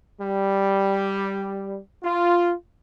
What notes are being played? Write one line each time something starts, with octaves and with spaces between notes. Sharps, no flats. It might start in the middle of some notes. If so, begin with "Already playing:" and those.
G3
F4